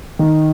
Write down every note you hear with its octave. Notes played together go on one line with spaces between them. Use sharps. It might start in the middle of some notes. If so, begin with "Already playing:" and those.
D#3